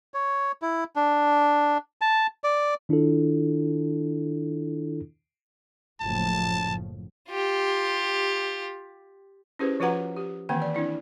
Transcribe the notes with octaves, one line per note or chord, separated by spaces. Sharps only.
C#5
E4
D4
A5
D5
D#3 D4 E4 F4 A4
F#1 A2 F3 A5
F4 G4
C#4 E4 G4 G#4 B4 C5
F3 F4 F#4 B4 F#5 A#5
G4
D#3 E3 A#3 C4 G5
D5
C4 D4 E4 D5